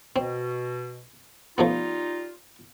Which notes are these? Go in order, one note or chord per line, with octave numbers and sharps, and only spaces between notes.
B2 C4
F3 G3 A3 B3 D#4 F4